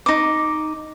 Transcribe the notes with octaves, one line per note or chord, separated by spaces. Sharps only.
D#4 D6